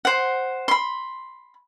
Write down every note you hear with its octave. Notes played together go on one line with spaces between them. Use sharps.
C5 F#5
B5 C6